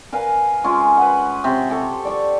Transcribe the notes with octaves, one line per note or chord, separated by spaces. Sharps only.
A#4 B4 F5 G#5
G#3 C#4 F4
B4 F#5
C3
G4 A4 C#6
D5 A5 C#6